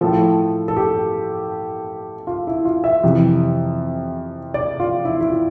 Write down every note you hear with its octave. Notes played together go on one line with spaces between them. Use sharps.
A2 F3 A4
A4
G4
F4
E4
F4
E5
F2 C3 E3
D5
F4
E4
E4
F4